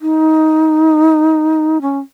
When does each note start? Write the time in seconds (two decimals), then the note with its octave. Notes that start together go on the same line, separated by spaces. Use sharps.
0.01 D#4
1.81 C#4